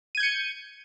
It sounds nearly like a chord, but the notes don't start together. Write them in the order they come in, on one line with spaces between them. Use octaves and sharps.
D#7 G#6 G6 C#7